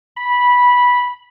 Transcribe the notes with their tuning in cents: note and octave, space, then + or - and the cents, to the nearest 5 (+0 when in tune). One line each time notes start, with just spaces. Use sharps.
B5 -10